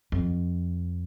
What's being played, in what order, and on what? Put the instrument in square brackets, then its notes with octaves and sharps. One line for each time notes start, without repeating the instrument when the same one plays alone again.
[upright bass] F2